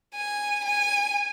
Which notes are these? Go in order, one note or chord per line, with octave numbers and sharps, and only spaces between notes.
G#5
G#5